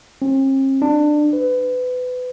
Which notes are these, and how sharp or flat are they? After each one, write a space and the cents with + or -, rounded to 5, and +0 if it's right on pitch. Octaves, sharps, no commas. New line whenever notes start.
C4 +45
D4 +20
B4 +25